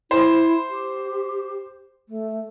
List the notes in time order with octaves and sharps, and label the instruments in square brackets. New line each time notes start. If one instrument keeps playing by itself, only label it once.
[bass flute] E4 [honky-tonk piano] C5
[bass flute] G4
A3